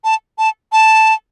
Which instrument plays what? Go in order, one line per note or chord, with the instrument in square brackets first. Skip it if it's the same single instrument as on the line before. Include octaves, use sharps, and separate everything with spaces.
[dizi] A5
A5
A5